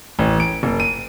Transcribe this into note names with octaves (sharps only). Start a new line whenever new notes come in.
A1
D7
F#1
D#7